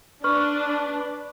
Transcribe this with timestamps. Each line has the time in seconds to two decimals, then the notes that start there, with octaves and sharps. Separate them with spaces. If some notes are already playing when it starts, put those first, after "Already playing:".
0.24 D4 B4 C#6 F6